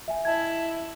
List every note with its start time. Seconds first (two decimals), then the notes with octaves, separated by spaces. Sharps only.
0.08 E5 G#5
0.25 E4 D#5 A5 G#6